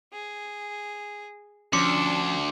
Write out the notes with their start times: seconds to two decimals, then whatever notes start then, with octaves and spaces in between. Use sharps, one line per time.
0.12 G#4
1.73 D2 F3 C#4 D4 A5 C6 D6 C#7